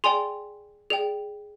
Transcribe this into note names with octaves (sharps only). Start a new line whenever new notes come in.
G#4 D5 G5 G#5 C6
G#4 D5 G5